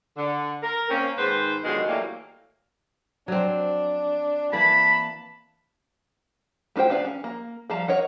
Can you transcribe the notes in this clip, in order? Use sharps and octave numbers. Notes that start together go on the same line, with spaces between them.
D3
A#4
A#3 C4 C#4
G#2 D#3 B4 C5
B2 D3 D#3 F#3 G#3 F4
E3 F#3 G3 A3 A#3
F#3 C4 D4
E3 A#3 A5 B5
A3 D#4 F4 C5 G5
B3 D4 F5 A5
C#4
A#3
F3 G3 F5 A5 A#5
A#4 C#5 D#5 F#5